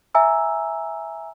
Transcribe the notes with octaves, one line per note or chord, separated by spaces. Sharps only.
E5 G#5 A#5 E6